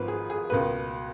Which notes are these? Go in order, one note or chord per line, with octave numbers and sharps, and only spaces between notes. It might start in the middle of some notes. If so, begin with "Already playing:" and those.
Already playing: G#1 G#2 F3 A#3 B4
G#4
G#4
C#2 B2 A#3 B4